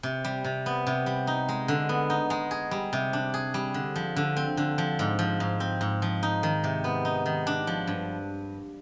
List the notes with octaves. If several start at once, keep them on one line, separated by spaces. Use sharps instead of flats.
C3
G3
C3
B3
C3
G3
D#4
G#3
D3
B3
D#4
G#3
G#4
G3
C3
D4
G#4
G3
D3
F3
D3
C4
D3
F3
G#2
F3
G#2
C4
G#2
F3
D#4
D#3
C3
B3
D#4
D#3
D4
F3
G2